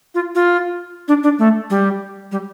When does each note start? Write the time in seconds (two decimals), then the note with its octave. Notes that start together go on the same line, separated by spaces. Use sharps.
0.15 F4
0.35 F4
1.08 D4
1.23 D4
1.39 A3
1.70 G3
2.32 G3